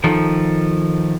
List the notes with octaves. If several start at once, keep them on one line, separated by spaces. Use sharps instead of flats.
D#3 F3 A4